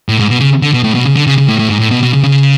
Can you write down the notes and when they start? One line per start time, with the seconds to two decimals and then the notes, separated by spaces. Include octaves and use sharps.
0.09 A2
0.19 G#2
0.30 B2
0.40 C#3
0.62 D3
0.73 B2
0.84 A2
0.95 B2
1.05 C#3
1.16 D3
1.27 C#3
1.38 C#3
1.48 A2
1.59 A2
1.70 G#2
1.80 A2
1.91 B2
2.03 B2
2.13 C#3
2.23 C#3